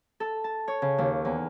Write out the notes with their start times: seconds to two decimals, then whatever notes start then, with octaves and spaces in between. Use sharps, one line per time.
0.20 A4
0.44 A5
0.68 C#5
0.82 C#3
0.98 D#2
1.25 E2